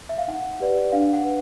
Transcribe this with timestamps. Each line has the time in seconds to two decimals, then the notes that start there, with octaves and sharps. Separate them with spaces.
0.09 E5
0.18 F5
0.28 D#4 F#5
0.60 G4 B4 D5
0.92 D4 F5
1.13 F#5
1.24 B4